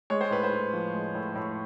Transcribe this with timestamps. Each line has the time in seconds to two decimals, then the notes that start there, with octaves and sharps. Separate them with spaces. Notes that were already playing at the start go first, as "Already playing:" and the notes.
0.10 G#3 C#5
0.21 C5
0.31 A2 B4
0.43 C5
0.52 A2
0.73 F3
0.94 G#3
1.15 A2
1.36 A2